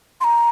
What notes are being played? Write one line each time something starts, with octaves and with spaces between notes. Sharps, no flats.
C6
A#5